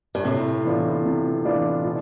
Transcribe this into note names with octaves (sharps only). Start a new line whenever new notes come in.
G2
A2 C3
E3 B3 D4 F4
C3
E3 B3 D4 F4
B2